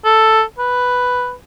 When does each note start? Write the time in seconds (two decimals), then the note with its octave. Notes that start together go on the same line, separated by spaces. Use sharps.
0.05 A4
0.58 B4